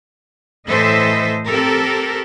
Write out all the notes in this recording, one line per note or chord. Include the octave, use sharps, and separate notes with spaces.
A2 E3 A4 C5 D#5 E5
C4 G4 A4 A#4